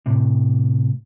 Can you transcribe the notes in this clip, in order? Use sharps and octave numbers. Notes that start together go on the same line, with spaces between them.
A2 C3